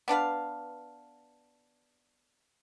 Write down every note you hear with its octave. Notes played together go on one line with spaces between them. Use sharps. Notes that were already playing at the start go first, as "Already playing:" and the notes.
B3 D4 B4 F5